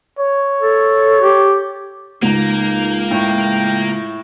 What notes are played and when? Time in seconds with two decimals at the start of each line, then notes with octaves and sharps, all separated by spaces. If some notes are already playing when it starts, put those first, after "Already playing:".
0.19 C#5
0.61 A4
1.22 G4
2.22 C#2 A#3 D#4
3.11 A2 G5